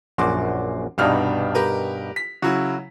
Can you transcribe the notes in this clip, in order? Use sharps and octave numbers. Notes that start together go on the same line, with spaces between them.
A#1 F#2 F#4 C6 D6
C2 G2 B2 D4 D#4 F6
G4 A#4 B4
B6
C#3 F#3 E4 F#4